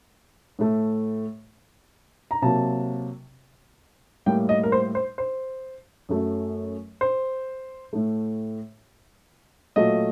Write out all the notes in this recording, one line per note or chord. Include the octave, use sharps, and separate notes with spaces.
A2 A3
A#5
C3 F#3 A#3 A5
A2 G3 A#3 G5
D#5
A#4
C5
C5
C5
F#2 F#3 A3
C5
A2 A3
A#2 F#3 A3 D#5